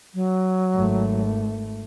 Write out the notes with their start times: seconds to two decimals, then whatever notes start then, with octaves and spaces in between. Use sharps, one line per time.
0.14 F#3
0.75 G#1 A3